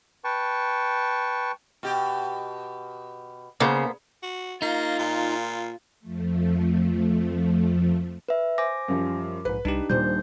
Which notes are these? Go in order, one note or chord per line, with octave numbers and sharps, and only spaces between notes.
B4 G5 A5 C#6
B2 G4
C#3 A#3 B3 C5
F#4
A#3 D#4 F4
A#2
F2 F3 A3
B4 E5
C5 G#5 D6 A#6
F#2 F3 G3
A#1 G#2 B4
C2 D4 D#4 G4
D#1 A#2 G3 C5 G6